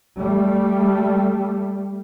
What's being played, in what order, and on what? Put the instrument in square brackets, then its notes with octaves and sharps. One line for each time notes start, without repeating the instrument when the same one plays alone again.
[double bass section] G3 A3